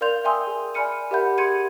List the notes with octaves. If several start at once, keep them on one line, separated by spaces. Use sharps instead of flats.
A#4 D5 F5 C6 G6 F7
E5 G5 G#5 C6 D#6 E6
G#4
D5 G#5 B5 F6 C#7 D#7
G4 A#4 E5 F#5 B5 G6
G#4 C6 G#6 C#7 D#7